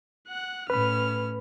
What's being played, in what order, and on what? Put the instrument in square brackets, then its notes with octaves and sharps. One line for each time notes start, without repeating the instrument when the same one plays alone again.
[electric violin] F#5 F#6
[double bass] A2 [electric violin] C#4 F6 [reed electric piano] B4 B5